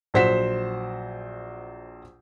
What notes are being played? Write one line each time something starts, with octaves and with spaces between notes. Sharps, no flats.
A#1 F#3 C5 F#5 B6 E7